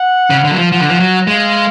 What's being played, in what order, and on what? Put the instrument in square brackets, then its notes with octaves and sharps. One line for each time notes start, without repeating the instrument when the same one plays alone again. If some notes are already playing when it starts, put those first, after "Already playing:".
Already playing: [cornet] F#5
[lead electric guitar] C#3
D3
F#3
F3
[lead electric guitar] F3 [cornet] F#5
[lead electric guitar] D3
F3
F#3
[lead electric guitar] G#3 [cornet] F5